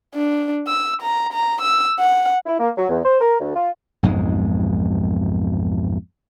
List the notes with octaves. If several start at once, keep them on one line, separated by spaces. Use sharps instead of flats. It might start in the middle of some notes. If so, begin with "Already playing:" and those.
D4
E6
A#5
A#5
E6
F#5
E4
A#3
F#3
E2
C5
A#4
D2
F4
B1 F2 G#2 G#3